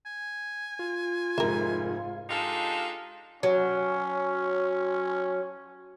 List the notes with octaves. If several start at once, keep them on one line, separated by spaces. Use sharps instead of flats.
G#5
F4
F1 G#2 A#4 E5
G#3 D4 D#4 F4 G4 A4
F#3 C#4